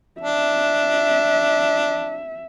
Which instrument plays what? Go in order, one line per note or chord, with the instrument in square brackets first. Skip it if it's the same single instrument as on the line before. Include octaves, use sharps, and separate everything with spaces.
[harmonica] D4 [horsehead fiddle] E5